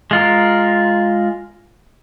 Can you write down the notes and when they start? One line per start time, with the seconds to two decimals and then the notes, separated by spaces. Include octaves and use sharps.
0.11 G#3 F4 A#4